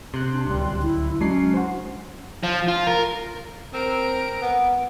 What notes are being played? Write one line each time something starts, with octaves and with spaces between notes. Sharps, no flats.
C3 C6 F#6
D4
D1 C#2 G3
E4
F#3 G#3 C#4 D4 C7
F#4 C5
F3
F4
A#4
C4 A#4 D7
B3